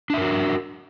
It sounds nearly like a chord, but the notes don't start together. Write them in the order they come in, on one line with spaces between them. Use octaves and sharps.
D4 E5 A#4 F#4